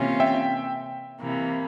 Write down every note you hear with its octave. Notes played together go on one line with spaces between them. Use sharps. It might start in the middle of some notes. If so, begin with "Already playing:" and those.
Already playing: C3 E3 A#3 C#4 F4
E5 G5
C3 E3 A#3